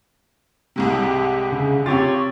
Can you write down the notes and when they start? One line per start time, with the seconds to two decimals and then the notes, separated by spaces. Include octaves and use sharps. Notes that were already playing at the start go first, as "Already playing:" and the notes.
0.76 C2 G#2 C3
0.90 G4
1.52 C#3
1.86 C3 C4 F4 G4 C#5 A6